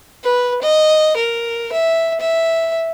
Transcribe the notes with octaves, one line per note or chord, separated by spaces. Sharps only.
B4
D#5
A#4
E5
E5